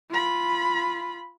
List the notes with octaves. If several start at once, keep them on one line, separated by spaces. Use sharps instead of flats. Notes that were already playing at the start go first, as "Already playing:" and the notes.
F4 B5